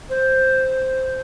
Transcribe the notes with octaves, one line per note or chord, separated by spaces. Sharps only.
C5